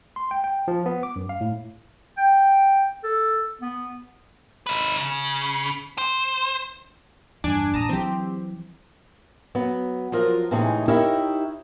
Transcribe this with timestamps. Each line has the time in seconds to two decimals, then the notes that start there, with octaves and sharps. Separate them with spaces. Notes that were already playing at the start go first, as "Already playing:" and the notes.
0.16 C6
0.31 G5
0.44 G5
0.68 F3
0.86 B3
1.03 D6
1.16 F#2
1.29 F5
1.41 A2
2.18 G5
3.04 A4
3.61 B3
4.67 D#4 B4
4.97 C#3
5.98 C5
7.44 E2 G2 D4 G#5 D6
7.74 A1 A#2 A5 A#5 D#6
7.89 E3 F#3 C4 G4
9.55 F#3 B3
10.12 F3 F#3 F4 A#4
10.51 A2 C3 E3 G#3 C#4 D#4
10.88 D#4 E4 G4 A#4 C#5 E5